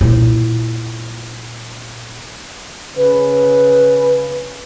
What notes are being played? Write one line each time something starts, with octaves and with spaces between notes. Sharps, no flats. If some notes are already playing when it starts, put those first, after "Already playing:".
A#2 E4
C#3 B4